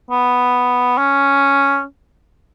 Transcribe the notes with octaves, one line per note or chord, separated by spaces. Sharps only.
B3
C#4